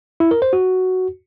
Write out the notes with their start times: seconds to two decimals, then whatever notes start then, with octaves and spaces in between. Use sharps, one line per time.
0.20 E4
0.31 A#4
0.42 C5
0.53 F#4